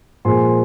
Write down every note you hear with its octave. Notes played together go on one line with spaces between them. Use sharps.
A#2 F3 G#3 G#5 C6